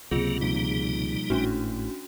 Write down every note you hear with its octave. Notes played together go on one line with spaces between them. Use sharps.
C#2 C3 F#3 A#3 F4 G#4
B2 F3 G3 A#3 D#4
G#1 A2 C#4 D4 F#4